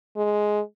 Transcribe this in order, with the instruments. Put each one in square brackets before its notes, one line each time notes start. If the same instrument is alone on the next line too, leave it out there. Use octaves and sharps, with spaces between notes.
[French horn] G#3